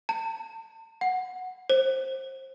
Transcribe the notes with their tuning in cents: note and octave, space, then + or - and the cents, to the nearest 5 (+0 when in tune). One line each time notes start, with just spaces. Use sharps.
A5 +40
F#5 -5
C5 +25